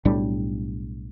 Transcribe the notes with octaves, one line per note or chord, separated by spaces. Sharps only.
B1 A2 G3 D4